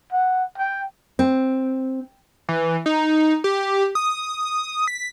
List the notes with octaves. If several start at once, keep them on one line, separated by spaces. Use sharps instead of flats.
F#5
G5
C4
E3
D#4
G4
D#6
B6